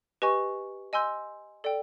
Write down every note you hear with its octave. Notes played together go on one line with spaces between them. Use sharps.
G4 B4 D#5 G#5 C#6
D#5 G#5 C6 E6 G6
A4 D5 G5